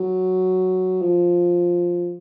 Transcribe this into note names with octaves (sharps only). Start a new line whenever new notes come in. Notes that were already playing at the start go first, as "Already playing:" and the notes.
Already playing: F#3
F3